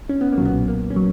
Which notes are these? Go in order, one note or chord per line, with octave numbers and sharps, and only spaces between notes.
C#4
B3
A#3
B1 A#2 F#3
B3
A#3
C#4
F#3